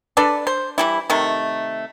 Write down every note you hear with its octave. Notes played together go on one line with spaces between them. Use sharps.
D4 A4 B4 D5
C5
E3 G3 E4
C3 D#3 A3